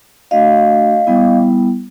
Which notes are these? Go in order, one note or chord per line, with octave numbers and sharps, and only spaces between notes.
A3 D4 F#4 D#5 F5
G3 B3 E4